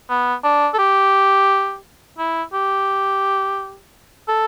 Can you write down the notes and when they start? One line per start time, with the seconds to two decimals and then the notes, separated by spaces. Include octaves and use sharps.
0.10 B3
0.44 D4
0.74 A4
0.79 G4
2.18 E4
2.53 G4
4.28 A4